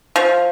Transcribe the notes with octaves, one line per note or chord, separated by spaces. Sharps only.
F3